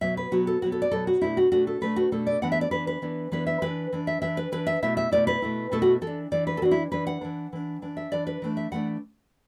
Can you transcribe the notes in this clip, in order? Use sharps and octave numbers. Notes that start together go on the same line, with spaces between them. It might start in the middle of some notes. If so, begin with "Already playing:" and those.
B2 F#3 B3 E5
B4
B2 F#3 B3 F#4
A4
B2 F#3 B3 F#4
A4
D5
B2 F#3 B3 A4
F#4
B2 A3 D4 E4
F#4
B2 A3 D4 F#4
A4
B2 A3 D4 B4
F#4
B2 A3 D4 A4
D5
E3 B3 D4 F#5
E5
D5
E3 B3 D4 B4
B4
E3 B3 D4
E3 B3 D4 B4
E5
E3 D4 B4
E3 D4
E5
E3 D4 E5
B4
E3 D4 B4
E5
B2 A3 E4 E5
E5
B2 A3 E4 D5
B4
B2 A3 E4
B2 A3 E4 A4
F#4
E3 A4
D4
E3 D4 D5
B4
A4
E3 D4 F#4
E4
E3 D4 B4
F#5
E3 D4
E3 D4
E3 D4
E5
E3 D4 D5
B4
E3 A3 D4
E5
E3 A3 D4 F#5